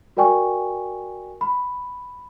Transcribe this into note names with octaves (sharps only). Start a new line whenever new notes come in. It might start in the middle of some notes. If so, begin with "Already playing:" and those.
F#4 A#4 D5 G5 G#5 C#6
B5